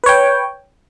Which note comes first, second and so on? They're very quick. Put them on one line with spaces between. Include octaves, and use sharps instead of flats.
B4 C#5 G5